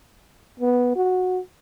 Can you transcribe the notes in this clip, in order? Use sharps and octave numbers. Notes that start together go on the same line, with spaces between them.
B3
F#4